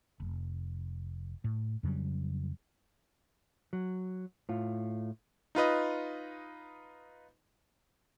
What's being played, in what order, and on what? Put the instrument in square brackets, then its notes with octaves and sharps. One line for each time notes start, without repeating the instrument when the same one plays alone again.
[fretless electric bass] F1
A2
F2 C#3 F#3 G3
[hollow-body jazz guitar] F#3
A2 F4
[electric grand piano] D#4 F4 B4 D#5